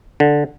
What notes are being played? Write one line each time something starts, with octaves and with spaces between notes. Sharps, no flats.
D3